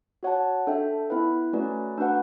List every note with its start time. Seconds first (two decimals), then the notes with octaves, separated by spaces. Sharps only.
0.23 F#4 C#5 F#5 A5
0.67 D4 A4 E5 G5
1.10 B3 E4 B4 E5
1.53 A3 C#4 F#4 B4 D5
1.97 A3 D4 F#4 B4 F#5